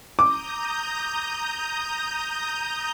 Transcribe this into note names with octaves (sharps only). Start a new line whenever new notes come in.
A#5 D6 D#6 G6